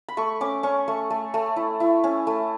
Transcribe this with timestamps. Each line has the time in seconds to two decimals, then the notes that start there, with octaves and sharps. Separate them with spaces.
0.09 B5
0.17 A3 C#6
0.41 C#4 D6
0.63 C#4 C#6
0.88 A3 C#6
1.10 A3
1.34 A3
1.56 E4
1.80 E4
2.04 C#4
2.27 A3